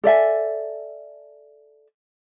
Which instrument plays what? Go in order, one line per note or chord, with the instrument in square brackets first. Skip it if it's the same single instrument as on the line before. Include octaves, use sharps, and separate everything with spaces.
[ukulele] A4 D5 E5 G#5